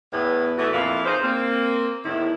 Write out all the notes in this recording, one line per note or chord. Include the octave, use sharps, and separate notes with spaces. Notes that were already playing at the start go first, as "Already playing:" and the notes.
E2 A2 B3
E3 A3 B3 D4 F#4
F2 A#2 E4 F5
D#4 G#4 C5
A#3 C4
E2 A2 D#3 E4